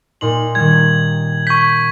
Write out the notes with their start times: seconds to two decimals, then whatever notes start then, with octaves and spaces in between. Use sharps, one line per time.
0.21 A#2 D#4 C6 F#7
0.55 D#3 G3 G#6
1.47 C#6 G6 B6 C7